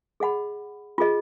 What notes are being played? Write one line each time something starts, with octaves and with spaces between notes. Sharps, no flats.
G#4 D#5 F#5 B5
F4 G#4 D#5